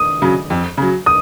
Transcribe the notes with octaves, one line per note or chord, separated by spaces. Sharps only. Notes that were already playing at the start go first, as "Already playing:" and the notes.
Already playing: D#6
C#3 F#3
F2
C#3 F#3
D#6